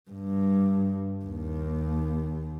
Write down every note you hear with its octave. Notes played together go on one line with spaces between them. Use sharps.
G2
D#2